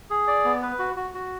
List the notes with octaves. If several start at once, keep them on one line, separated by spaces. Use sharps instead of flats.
G#4
D5
B3
B4
F#4
F#4
F#4